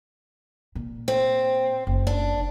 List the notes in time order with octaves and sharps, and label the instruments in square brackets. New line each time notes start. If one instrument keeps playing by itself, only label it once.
[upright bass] A#2
[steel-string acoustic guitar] C4
[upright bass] F#1
[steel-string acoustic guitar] D4